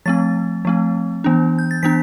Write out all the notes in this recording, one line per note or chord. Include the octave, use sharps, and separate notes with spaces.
F3 A3 C4 A6
F3 A3 C4
E3 B3 D4
G6
A6
E3 B3 D4 B6